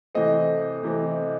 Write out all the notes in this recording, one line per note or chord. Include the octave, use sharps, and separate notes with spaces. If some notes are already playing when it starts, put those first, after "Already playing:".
C3 E3 A3 C4 D#5
C3 E3 A3 C4